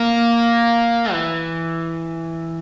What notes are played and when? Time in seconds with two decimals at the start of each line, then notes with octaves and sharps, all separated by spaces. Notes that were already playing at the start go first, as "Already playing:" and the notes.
Already playing: A#3
1.12 E3